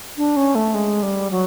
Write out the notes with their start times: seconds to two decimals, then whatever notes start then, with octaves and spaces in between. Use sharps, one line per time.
0.17 D4
0.36 C#4
0.55 A3
0.74 G#3
1.02 G3
1.31 F#3